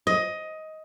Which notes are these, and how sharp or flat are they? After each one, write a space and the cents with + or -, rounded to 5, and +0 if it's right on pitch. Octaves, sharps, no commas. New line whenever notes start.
D#5 +15